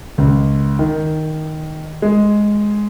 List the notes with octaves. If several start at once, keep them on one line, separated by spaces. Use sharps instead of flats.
C#2
D#3
G#3